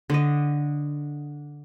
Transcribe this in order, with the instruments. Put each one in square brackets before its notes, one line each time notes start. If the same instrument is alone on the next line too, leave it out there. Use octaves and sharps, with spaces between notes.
[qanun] D3 D#5